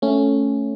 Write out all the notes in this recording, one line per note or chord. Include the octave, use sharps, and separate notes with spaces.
A3 C#4